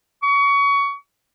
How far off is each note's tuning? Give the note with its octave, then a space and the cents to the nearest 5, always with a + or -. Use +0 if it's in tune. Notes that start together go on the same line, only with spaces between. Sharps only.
C#6 +25